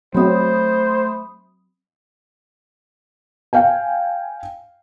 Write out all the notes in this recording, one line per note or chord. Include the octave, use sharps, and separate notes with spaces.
F#3 A3 C4 C5 B5 D#6
F5 G5 G#5